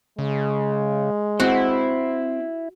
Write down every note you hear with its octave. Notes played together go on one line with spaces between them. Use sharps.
C#3 G#3
C4 E4 F#4 C5